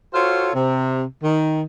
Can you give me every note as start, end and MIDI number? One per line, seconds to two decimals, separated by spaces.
0.13 0.49 65
0.13 0.49 66
0.13 0.49 69
0.13 0.49 72
0.13 0.49 73
0.13 0.49 77
0.54 1.01 48
1.23 1.61 51